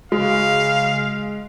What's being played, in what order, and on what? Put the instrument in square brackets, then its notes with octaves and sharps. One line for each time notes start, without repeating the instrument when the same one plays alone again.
[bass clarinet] C#3 [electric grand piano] G#3 [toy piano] F#4 [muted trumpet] F5